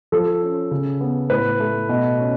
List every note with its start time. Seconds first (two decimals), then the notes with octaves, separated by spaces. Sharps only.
0.12 F3 A4
0.42 C#4
0.71 C#3
1.01 B3
1.30 A2 B4
1.60 A3
1.89 B2
2.19 C#4